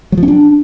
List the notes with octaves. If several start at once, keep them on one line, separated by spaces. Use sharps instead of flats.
F#3
F3
C#4
D4